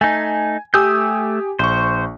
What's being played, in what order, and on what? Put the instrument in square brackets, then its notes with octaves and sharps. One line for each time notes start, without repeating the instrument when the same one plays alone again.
[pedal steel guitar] A3 D#4 [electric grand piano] G#5
[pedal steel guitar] A3 E6 G6 [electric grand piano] G4 G#5 D#6
[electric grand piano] A#1 C#6 [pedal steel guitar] C5